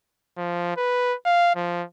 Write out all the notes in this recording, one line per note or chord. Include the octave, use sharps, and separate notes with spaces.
F3
B4
F5
F3